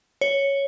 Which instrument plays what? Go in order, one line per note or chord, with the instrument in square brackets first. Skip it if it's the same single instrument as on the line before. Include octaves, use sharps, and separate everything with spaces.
[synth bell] C#5